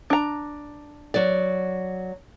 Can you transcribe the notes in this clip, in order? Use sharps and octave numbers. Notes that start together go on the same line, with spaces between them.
D4 A#5
F#3 D5